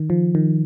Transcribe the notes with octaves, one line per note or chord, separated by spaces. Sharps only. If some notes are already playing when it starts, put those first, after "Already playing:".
Already playing: D#3
F3
D#3